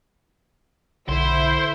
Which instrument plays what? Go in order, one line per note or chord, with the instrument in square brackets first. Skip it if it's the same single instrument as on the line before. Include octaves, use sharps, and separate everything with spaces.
[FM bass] B1 [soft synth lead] D3 [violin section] E4 [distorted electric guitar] C5